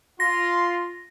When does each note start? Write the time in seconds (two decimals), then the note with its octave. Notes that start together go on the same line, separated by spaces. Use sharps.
0.20 F4 C6 A#6